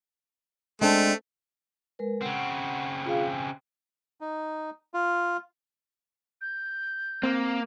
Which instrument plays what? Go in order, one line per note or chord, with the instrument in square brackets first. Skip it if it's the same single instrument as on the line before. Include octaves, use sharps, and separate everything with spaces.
[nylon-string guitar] G#3 C4 D4 [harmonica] A3
[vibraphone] G#3 A#4 B4
[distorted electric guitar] C#3 C4 [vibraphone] F#5
[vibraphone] F4 G#4 F5
G#5
[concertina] D#4
F4
[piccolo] G6
[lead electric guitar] A#3 [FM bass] C4